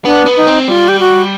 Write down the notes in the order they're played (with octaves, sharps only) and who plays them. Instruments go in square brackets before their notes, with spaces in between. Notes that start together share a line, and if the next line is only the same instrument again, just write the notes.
[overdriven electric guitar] B3 [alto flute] D4
[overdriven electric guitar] B3
[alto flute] D#4
[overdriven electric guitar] C4
[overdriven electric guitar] G3 [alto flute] F4
[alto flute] G4
F#4